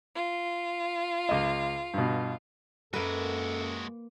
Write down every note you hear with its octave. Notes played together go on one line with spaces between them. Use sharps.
F4
C#2 D#5
G2 B2
F#2 G#3 A#3 F#4 A4 B4